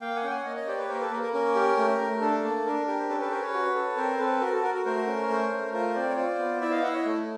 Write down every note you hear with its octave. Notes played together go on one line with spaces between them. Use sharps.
A#3 F5 G5
F#5 G#5
C#4 G5
F#5 G#5
A#3 C#5 D#5
C#5 D#5
G4 C5 D5
B4 C#5
A#3 A#4 C5
A4 B4
A#3 A#4
A#4
C#4 A#4
G4
A3
A3
D4 A4
A#3
D4 A#4
G4 A#4
C5
C#4 A4 B4
A4 B4
C#4 A#4 C5
B4 C#5
F#4
A4
C4 A#4 C5
C4 A4 B4
F#4 A#4
A4
F#4 A#4
A#4
A3 A#4 C5
C#4
A3
A3
F4 A#4 C5
C4 C5 D5
C#5
F4 C5 D5
B3
E4 D5 E5
D#5 F5
E4 E5 F#5
C#5 D#5
A3